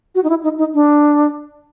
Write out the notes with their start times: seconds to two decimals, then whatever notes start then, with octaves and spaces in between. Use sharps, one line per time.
0.15 F#4
0.24 D#4
0.30 E4
0.44 D#4
0.58 D#4
0.74 D4